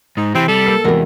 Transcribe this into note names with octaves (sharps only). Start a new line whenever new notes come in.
G#2 D#4
C3 E3 C4
G3 A4
A#3 E6 C7
E2 C3 G3 G#3 F#4 A#4